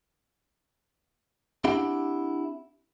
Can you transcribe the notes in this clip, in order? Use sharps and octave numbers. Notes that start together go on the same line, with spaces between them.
C4 D4 E4 G4 F#5